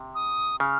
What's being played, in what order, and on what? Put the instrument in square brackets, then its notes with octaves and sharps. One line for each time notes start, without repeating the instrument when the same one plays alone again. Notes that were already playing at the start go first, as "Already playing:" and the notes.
Already playing: [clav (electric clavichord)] C3
[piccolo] D#6
[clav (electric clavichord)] C#3 [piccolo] F6